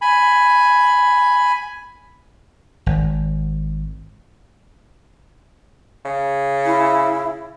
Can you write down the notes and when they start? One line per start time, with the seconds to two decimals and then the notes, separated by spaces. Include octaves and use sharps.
0.02 G#5 B5
2.86 G#1
6.05 C#3
6.65 E4